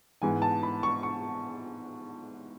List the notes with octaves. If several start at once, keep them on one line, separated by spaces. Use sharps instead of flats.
G#2 E3 B3 G#5
A5
B5
C#6
C#6